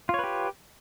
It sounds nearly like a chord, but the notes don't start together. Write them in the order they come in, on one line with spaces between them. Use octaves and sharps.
F4 C#5 B4 G4